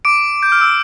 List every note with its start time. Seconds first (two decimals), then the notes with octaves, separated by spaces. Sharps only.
0.05 D6 D7
0.43 G6
0.52 F6
0.61 E6